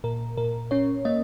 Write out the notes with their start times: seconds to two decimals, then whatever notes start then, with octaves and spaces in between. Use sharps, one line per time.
0.04 A#2 A#4
0.37 A#2 A#4
0.71 C#4 C#5
1.05 A#3 D#5